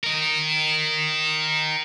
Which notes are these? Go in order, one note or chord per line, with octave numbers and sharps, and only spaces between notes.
A#4 D#5